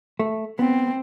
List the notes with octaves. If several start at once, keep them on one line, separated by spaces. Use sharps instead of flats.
A3
B3 C4